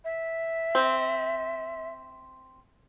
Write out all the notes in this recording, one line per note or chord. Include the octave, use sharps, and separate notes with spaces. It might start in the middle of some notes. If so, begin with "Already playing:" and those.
E5
C4